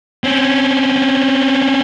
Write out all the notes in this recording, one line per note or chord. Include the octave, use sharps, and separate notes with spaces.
C4 C#4